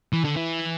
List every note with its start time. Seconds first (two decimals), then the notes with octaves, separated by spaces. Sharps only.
0.13 E3
0.24 D3
0.36 E3